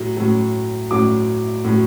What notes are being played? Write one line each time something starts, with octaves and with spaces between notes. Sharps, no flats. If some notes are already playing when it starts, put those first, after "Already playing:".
Already playing: A2 F#3
A2 F#3
A2 F#3 D6
A2 F#3